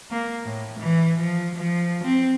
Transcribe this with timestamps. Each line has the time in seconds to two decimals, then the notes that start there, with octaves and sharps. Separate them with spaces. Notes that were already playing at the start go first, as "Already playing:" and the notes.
0.11 A#3
0.45 A2
0.79 E3
1.19 F3
1.55 F3
2.04 C4